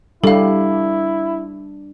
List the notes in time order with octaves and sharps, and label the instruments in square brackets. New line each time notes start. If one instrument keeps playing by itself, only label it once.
[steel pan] G3 [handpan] D4 [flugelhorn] E4 [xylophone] A4 F5